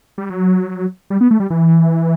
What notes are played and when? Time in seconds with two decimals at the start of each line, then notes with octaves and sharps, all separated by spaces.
0.18 G3
0.30 F#3
1.10 G3
1.21 B3
1.31 A3
1.40 G3
1.50 E3